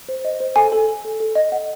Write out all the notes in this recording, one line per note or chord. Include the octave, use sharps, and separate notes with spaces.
C5
D#5
C5
A4 G#5
A4
A4
A4
A4
D#5
F#5